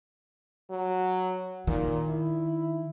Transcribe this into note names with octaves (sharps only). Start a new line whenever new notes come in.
F#3
A#2 D#3
E4